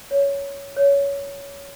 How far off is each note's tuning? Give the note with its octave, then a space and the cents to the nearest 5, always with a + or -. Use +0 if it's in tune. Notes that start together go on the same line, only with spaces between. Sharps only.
C#5 +10
C#5 +15